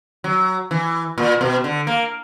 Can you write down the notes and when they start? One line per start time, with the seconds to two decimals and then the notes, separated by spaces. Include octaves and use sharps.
0.24 F#3
0.71 E3
1.18 A#2
1.41 B2
1.64 D3
1.87 A#3